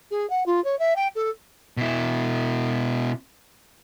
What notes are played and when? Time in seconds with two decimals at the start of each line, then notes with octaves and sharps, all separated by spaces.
0.11 G#4
0.29 F#5
0.46 F4
0.64 C#5
0.79 E5
0.96 G5
1.15 A4
1.77 B2 E4